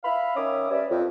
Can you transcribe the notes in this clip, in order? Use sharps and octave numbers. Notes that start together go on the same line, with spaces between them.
E5 F5 B5
D#3 C#4 E5 D6 D#6
G3 C#4 B4 D5 E5
F2